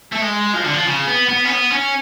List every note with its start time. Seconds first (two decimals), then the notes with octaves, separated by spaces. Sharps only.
0.13 A3
0.22 G#3
0.54 F3
0.64 D3
0.74 F3
0.86 C#3
1.07 B3
1.29 B3
1.45 C#4
1.50 B3
1.72 C#4